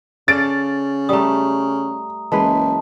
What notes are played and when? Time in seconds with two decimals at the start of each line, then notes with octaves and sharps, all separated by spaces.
0.28 C#3 A4 D5 F5 A6 D7
1.09 G3 A3 A#5 D#6
2.32 F#1 E3 G#3 B4 A5